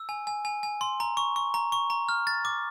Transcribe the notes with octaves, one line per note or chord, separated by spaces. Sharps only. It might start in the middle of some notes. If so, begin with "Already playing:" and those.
Already playing: E6
G#5
G#5
G#5
G#5
C6
A#5
C#6
C#6
A#5
C#6
A#5
F6
A6
D6